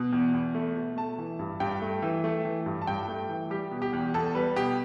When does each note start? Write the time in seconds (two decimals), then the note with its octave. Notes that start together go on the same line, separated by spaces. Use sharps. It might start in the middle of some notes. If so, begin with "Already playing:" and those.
Already playing: B2
0.12 E2
0.34 E2
0.55 A3
0.76 B2
0.97 A3 A5
1.18 E3
1.39 G2
1.60 G2 G5
1.82 A3
2.02 E3
2.24 A3
2.45 E3
2.66 G2
2.82 A5
2.87 G2 G5
3.08 A3
3.29 E3
3.50 G3 G4
3.71 B2
3.82 G4
3.93 E2
4.14 E2 A4
4.35 G3 B4
4.56 B2 G4